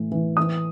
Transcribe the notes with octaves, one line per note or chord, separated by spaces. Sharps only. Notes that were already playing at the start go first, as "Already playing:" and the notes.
Already playing: A2 E3
E3
E3 D#6